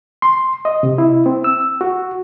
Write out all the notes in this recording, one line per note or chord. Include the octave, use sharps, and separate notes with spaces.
C6
D#5
C3
E4
C4
E6
F#4